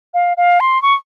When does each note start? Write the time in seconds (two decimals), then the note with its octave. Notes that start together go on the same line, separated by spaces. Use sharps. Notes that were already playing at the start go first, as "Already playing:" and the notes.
0.14 F5
0.37 F5
0.60 C6
0.82 C#6